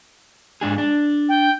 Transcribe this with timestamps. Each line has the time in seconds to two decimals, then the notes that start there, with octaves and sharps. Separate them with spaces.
0.61 G#2 D4 G#4
0.78 D4
1.29 G5